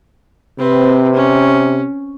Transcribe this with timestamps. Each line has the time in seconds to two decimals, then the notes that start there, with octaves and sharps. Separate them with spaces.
0.59 C3 C4 B4
1.14 C#4